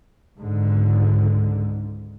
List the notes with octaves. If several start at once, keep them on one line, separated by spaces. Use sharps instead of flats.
C#2 G#2 D3